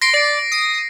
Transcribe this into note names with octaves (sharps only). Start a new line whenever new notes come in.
C6 A#6 C7 D7
D5
D#6